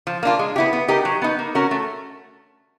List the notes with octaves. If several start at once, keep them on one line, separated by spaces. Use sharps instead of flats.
F3
A#3 D4 F4
G#3
B3 E4 G4
B3
D#4 G4 A#4 D#5
F#3
B3 D#4
A#3
C#4 F#4 A#4
A3